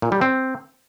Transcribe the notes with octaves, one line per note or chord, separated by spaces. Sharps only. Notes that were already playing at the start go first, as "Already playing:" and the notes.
A#2
G3
C4